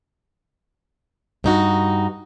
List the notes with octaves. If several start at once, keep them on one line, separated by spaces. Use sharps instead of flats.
G2 D#4 F#4